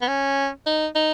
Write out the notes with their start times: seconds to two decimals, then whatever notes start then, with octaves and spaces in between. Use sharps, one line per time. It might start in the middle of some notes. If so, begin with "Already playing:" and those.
0.02 B3
0.08 C#4
0.66 D#4
0.95 D#4